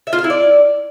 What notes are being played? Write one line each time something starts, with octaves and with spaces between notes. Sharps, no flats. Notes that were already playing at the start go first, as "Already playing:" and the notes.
E5
F4
F5
E4
D5